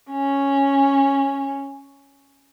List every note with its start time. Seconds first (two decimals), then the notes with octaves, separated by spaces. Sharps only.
0.11 C#4